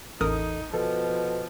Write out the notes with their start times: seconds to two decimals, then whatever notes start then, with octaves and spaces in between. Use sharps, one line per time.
0.21 A1 E2 D#4 A4 A#4 D#6
0.74 B2 F3 A4